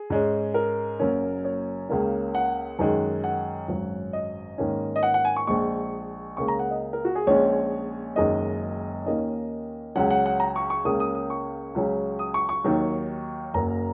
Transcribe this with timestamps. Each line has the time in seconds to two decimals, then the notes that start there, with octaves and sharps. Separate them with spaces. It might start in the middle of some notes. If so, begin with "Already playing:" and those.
Already playing: G#4
0.10 G#2 G#3 C#4
0.54 A#4
1.00 F#1 F#2 F#3 A#3 C#4
1.45 C#5
1.89 C#2 C#3 A#3 C#4
2.35 F#5
2.79 F#2 D#3 G#3
3.24 F#5
3.68 G#1 F#2 F#3
4.13 D#5
4.58 G#2 D#3 A#3 C#4
4.96 D#5
5.03 F#5
5.14 F#5
5.25 G#5
5.36 C#6
5.47 A#1 A#2 G#3 C#6
6.37 C#2 C#3 A#3 C#6
6.48 A#5
6.59 F#5
6.71 D#5
6.93 A#4
7.05 F#4
7.15 G#4
7.27 A#1 A#2 G#3 C#4 C#5
8.16 F#1 F#2 D#3 G#3 D#5
9.06 D#2 D#3 A#3 C#4 D#5
9.95 C#2 C#3 F#3 C#4 F#5
10.10 F#5
10.26 F#5
10.40 A#5
10.56 C#6
10.70 C#6
10.85 C#2 C#3 A#3 C#4 D#6
11.00 D#6
11.15 D#6
11.30 C#6
11.75 C#2 C#3 F#3 C#4
12.19 D#6
12.34 C#6
12.49 C#6
12.64 D#2 D#3 F#3
13.54 F#1 F#2 F#3 A#3 A#5